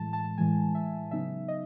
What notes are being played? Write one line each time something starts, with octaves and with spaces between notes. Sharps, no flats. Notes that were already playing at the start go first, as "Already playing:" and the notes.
Already playing: A2 E3 G#3 A5
A5
A2 E3 G#3 G#5
E5
C#3 F#3 B3 D#4 E5
D#5